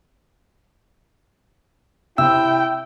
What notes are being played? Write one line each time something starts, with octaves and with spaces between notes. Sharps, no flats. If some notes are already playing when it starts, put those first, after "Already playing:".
C3 E4 G5 E6